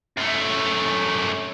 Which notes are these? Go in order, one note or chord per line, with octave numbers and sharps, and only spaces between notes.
F#2 A3